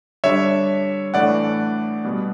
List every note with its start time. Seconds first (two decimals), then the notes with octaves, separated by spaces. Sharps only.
0.24 D3 G3 D4 C#5 E5
1.14 A2 E3 A3 D4 D5 F#5
2.04 B2 G3 B3